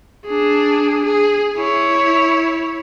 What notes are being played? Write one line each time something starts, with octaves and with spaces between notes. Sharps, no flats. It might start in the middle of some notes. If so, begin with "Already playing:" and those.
D4 G#4
G#4
E4 C#5